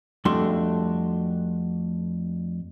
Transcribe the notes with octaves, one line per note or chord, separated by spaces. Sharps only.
F2 G3 A3 D4 F#4 C6